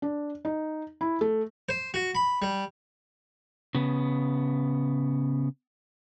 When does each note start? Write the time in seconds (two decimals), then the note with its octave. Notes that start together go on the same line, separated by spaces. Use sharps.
0.02 D4
0.45 D#4
1.01 E4
1.21 A3
1.69 C5
1.94 F#4
2.15 B5
2.42 G3
3.75 C#3 B3